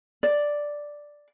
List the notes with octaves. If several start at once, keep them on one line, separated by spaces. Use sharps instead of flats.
D5